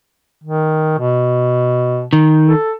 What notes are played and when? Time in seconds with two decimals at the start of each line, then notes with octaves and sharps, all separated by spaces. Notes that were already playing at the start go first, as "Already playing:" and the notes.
0.44 D#3
0.98 B2
2.13 D#3
2.47 A4